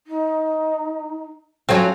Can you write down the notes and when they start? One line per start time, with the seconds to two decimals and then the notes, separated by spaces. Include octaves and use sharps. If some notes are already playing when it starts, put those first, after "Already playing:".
0.06 D#4
1.69 F#3 A3 C4 C#4 F4